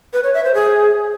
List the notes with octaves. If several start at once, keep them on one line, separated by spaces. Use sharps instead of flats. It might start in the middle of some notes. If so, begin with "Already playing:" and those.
B4
C#5
E5
C5
G#4